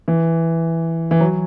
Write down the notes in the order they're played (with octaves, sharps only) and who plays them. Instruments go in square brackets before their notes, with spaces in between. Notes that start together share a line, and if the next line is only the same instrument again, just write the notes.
[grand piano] E3
E3
F#3